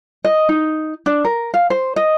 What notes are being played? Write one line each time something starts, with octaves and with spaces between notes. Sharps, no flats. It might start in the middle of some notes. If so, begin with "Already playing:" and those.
D#5
D#4
D4
A#4
F5
C5
D#5